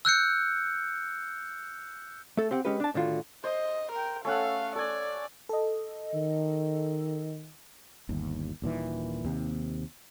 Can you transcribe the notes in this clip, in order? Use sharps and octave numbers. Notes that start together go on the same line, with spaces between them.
E6 F#6 G6 C#7
A3 A4
C4 G4 F#5
G#3 C#4 G4 B4
D4 A5
A2 D3 D#3 F4 F#4
C5 D#5
A#4 G5
A3 C#4 A4 F5 F#5
A4 D5 G#5
A4 D#5
D#3
G1 D#2
D#1 A#2 D#3 E3
D#2 C3